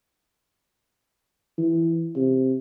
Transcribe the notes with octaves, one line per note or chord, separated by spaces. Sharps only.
E3
C3